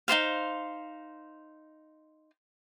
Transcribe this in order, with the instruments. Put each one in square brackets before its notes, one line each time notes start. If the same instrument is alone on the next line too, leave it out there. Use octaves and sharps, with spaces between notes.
[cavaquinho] D#4 F#4 C5 F5